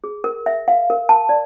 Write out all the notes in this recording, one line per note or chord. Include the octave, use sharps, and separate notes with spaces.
G#4
A#4
E5
F5
A#4
A5
D5